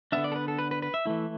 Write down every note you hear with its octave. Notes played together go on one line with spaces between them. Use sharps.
D3 B3 D4 E5
D5
A4
B4
A4
B4
B4
B4
E5
E3 A3 E4